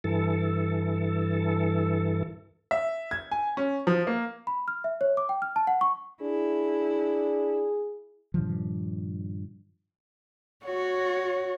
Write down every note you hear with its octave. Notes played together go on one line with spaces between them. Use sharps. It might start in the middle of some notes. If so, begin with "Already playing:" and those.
G2 E3 A4
E5
G#6
G#5
C#4
F3
A#3
B5
F6
E5
C#5
D6
G5
F6
A5
F#5
C#6
D4 E4 G#4
G2 A#2 D#3 F3
F#4 C#5